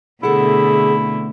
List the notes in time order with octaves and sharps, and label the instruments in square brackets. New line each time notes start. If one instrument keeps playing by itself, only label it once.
[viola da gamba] B2 D3 A3 [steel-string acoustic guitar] C4 A4 F#5 [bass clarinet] E4 [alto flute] G#4